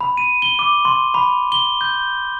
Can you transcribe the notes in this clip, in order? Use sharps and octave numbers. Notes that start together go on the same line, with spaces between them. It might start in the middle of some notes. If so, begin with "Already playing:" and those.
B5
D#7
G7
D6
C6
B5
G7
G6